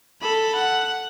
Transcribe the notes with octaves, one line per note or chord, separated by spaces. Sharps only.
A4 B5
F#5